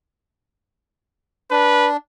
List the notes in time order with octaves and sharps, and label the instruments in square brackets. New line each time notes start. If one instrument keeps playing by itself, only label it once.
[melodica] D4 [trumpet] B4